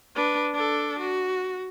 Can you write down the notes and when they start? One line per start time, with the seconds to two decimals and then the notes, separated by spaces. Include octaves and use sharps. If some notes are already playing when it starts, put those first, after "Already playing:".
0.16 D4 B4
0.54 D4 A4
0.99 F#4